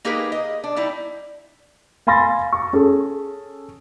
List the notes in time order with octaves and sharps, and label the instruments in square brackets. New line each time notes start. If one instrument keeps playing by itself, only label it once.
[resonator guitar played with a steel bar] A#3 D#4 G4 G#4 A#4 B4
D#5
D4
G3 D#4 E4
[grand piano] F5 G#5 B5 C6 A6 A#6
C#6
C#4 G#4 A4